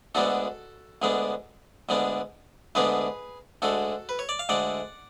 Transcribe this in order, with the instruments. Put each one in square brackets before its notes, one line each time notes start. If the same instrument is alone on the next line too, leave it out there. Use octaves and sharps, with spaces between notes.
[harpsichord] D2 D3 G#3 B3 D4 F#4 A4
D2 D3 G#3 B3 D4
D2 D3 G#3 B3 D4
D2 D3 G#3 B3 D4 G#4 B4
D2 D3 G#3 F#4 A4
B4
C#5
D5
F5
D2 D3 G#3 D5 F#5